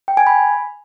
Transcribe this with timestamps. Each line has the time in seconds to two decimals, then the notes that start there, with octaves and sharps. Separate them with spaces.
0.08 G5
0.17 G#5
0.27 B5